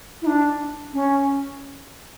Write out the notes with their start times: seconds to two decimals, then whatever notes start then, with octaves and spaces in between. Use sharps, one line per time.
0.22 E4
0.26 D4
0.93 C#4